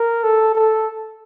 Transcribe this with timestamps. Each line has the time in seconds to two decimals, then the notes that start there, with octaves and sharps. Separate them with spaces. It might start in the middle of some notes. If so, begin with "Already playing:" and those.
Already playing: A#4
0.24 A4
0.55 A4